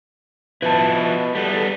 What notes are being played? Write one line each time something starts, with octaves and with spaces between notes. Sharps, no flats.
B2 F3 E4 B4 A5
E2 G3 B3 A4